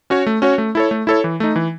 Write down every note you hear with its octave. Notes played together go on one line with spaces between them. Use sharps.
C#4 F#4 C#5
A3
C#4 F#4 C#5
A3
E4 A4 C#5
A3
E4 A4 C#5
E3
A3 D#4
E3